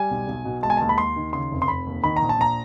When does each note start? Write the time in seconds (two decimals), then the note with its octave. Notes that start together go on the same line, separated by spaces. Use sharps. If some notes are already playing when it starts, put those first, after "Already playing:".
Already playing: G3 G#5
0.11 B1
0.27 B1
0.45 B2
0.63 G#3 A5
0.70 G#5
0.77 D#2 A5
0.89 B5
0.98 D#2 C6
1.16 D#3
1.33 C#3 C6
1.52 F1
1.62 C6
1.68 F1 B5
1.87 D#2
2.04 D#3 B5
2.16 A#5
2.22 A#1
2.29 A5
2.38 A#1 A#5